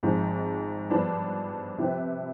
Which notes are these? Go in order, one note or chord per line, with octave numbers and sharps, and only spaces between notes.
G#1 G#2 F3
G2 F3 B3 D4
C3 F3 C4 G4 B4